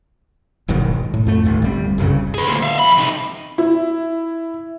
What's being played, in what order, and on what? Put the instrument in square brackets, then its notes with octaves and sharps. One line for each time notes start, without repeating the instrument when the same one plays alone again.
[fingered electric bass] E1 B1 G#2 D#3
A2
F2 A3
G1 D#2 A2
G1 G3 C4
F#1 C2 G2 C#3
[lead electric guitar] G#4 B4
D2 A#2
E5 F5
F2 B5
C3 D#4
[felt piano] E4